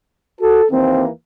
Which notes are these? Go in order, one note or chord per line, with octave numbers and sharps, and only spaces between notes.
F#4 A4
D#2 E3 A#3 C4